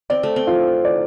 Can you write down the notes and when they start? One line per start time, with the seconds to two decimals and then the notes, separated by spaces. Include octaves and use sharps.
0.10 C4 D5
0.23 A3
0.36 C4
0.47 F4
0.85 D5